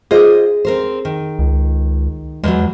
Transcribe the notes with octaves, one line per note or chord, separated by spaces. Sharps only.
F4 G#4 C5 D#5
C4 A#4 C5
D#3
C#2
E2 F#3 G#3